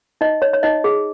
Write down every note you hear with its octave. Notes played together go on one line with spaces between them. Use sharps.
D#4 D#5
C#5
C#5
D#4 D#5
G#4